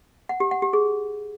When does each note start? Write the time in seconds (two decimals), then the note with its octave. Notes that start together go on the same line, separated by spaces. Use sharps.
0.29 F#5
0.40 G4
0.51 F#5
0.62 G4
0.73 G#4